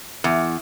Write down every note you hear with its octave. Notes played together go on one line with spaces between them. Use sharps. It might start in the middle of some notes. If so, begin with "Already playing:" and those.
E2